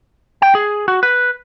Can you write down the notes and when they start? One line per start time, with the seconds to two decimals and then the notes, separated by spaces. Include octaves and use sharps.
0.42 G5
0.55 G#4
0.88 F#4
1.03 B4